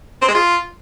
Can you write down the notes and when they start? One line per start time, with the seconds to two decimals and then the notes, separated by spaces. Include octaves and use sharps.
0.22 C4
0.28 G#3
0.35 F4